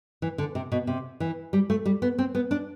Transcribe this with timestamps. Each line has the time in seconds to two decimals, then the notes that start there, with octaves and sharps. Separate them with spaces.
0.22 E3
0.38 D3
0.55 C3
0.72 B2
0.87 C3
1.20 E3
1.53 G3
1.70 A3
1.85 G3
2.02 B3
2.18 C4
2.35 B3
2.51 D4